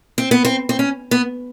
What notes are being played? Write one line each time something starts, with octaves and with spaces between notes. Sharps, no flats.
C4
B3
C4
C4
C#4
B3